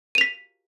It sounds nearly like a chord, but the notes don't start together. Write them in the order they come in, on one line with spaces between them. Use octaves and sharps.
D#7 F7 B6